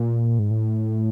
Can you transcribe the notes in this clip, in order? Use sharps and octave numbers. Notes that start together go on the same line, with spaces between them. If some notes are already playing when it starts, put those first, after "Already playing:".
Already playing: A#2
G#2
A2